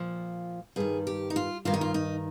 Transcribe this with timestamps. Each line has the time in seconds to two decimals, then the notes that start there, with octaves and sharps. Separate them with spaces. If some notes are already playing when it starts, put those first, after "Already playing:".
Already playing: A#2 F3
0.76 G2 D#3 G#4
1.07 G4
1.30 D#4
1.36 F4
1.65 G2 D#3 F4
1.74 D#4
1.81 F4
1.94 D#4